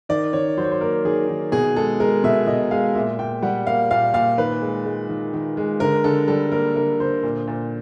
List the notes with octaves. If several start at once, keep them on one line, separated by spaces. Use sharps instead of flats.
D#3 D5
D#3 C#5
F#3 C5
C#5
C5
A#3 A#4
D#3 G#4
D#3
B2 G#4
G#3 A4
G#3 A#4
B2 E5
B2 D#5
G#3 F5
A#2 E5
A#2 G5
G3 F#5
A#3 F5
A#2 F5
A#2 F5
D#3 B4
G#3
G#3
D#3
D#3
G#3
D3 A#4
D3 A4
G3 A4
A#3 A#4
D3 A#4
D3 C5
A#2
A#2